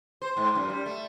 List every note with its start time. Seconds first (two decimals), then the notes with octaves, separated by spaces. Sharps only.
0.22 C5
0.37 G#2
0.55 F#2
0.70 G3
0.86 A3